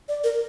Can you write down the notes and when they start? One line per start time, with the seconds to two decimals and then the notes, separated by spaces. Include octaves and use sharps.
0.09 D5
0.24 A#4